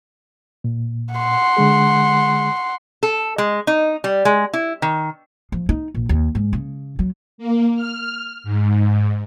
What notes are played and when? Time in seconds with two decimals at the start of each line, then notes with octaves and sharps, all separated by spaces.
0.64 A#2
1.14 F#5 C6
1.57 D3 G#3 G#4
3.03 A4
3.38 G#3
3.67 D#4
4.04 G3
4.25 G#3
4.54 E4
4.82 D#3
5.52 F3
5.69 D#4
5.94 A#1
6.09 D#2
6.35 G#2
6.53 C#3
6.99 F#3
7.38 A#3
7.75 F6
8.44 G#2